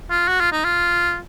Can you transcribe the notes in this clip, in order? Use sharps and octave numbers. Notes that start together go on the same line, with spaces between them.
F4
F#4
F4
D#4
F4